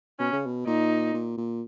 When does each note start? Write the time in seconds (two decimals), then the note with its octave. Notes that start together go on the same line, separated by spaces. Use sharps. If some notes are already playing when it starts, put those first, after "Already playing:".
0.19 B2 C#4
0.32 C#3
0.46 B2
0.66 A#2 D#4
1.13 A#2
1.37 A#2